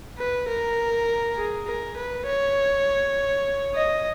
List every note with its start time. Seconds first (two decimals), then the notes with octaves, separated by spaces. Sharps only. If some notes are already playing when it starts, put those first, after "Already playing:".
0.18 B4
0.48 A#4
1.36 G#4
1.66 A#4
1.96 B4
2.26 C#5
3.75 D#5